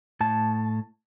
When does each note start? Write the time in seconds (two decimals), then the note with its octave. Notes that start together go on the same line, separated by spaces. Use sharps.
0.20 A2 A5